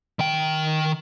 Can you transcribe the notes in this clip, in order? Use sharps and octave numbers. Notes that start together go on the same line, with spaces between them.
D#3 G5